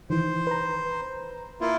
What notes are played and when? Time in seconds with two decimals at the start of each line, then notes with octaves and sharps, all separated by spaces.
0.10 D#3 E3 C5
0.47 B4 A#5
1.61 A#3 E4 F4